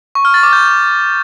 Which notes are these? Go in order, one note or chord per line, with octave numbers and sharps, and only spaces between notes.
C#6
F6
A6
D6
G6